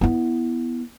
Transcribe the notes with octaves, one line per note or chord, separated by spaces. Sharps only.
B3 E4